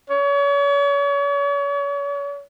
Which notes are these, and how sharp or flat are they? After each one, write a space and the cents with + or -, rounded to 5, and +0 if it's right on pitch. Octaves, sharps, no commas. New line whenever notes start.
C#5 +40